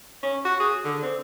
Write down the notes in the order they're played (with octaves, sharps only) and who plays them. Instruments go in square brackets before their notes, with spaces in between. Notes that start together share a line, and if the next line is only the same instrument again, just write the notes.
[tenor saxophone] C#4
F#4
G#4
D3
C4